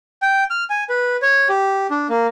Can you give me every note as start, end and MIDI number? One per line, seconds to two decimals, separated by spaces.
0.22 0.44 79
0.50 0.64 89
0.70 0.84 80
0.89 1.16 71
1.22 1.48 73
1.49 1.87 67
1.91 2.07 62
2.10 2.27 58